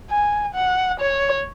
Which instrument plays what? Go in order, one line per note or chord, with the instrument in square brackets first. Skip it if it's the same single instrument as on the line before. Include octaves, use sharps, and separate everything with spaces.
[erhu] G#5
F#5
C#5